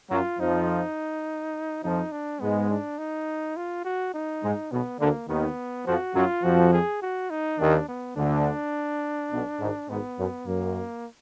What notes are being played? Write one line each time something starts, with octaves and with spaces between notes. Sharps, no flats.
F#2 F#3 F4
F2 F3 D#4
F2 F3 D#4
D4
G#2 G#3 B3
D4
D#4
F4
F#4
D#4
G#2 G#3
B1 B2 B3
D2 D3 A#3
D#2 D#3 B3
F2 F3 F#4
F#2 F#3 F4
F2 F3 F#4
G#4
F#4
D#4
D#2 D#3 D4
B3
D2 D3 D4
B1 B2
G#1 G#2
G#1 G#2 B3
F#2
F#2 A#3